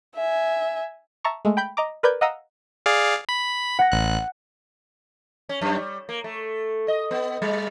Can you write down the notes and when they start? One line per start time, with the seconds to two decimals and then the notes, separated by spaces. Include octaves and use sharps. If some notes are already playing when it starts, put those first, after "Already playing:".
0.15 E5 G#5
1.24 E5 A5 A#5 C#6
1.45 G#3 A3
1.57 G5 B5 G6
1.77 D#5 A#5 D6
2.03 A#4 B4 D5 B5 G6 G#6
2.21 D#5 F5 F#5 A#5 D#6 E6
2.86 G#4 D5 F5
3.29 B5
3.79 F#5 A#6
3.92 A1 F#6
5.49 C#4
5.61 F#2
5.78 G3
6.09 A#3
6.24 A3
6.88 D#5
7.11 B3
7.42 G3